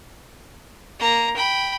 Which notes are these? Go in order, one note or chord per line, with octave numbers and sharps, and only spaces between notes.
A#3 A#5
G5 B5